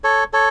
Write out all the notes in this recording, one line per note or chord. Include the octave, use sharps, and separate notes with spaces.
A4 C#5
A4 C#5